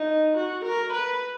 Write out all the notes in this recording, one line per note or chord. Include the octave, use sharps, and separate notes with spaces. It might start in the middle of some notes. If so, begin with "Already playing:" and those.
Already playing: D#4
F#4
A#4
B4